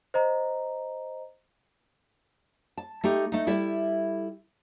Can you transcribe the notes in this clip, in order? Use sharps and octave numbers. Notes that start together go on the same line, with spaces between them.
C5 D#5 A#5
A5
A3 D#4 G4
A3 D#4
G3 E4 A4 E5